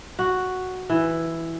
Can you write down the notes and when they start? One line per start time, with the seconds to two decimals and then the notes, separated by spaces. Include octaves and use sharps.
0.19 F#4
0.90 E3